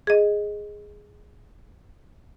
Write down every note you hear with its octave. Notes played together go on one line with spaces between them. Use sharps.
G#4 D#5